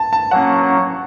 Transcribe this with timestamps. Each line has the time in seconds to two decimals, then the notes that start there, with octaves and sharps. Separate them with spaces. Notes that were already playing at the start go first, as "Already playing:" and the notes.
Already playing: A5
0.13 A5
0.31 F#3 A#3 C#4 F#5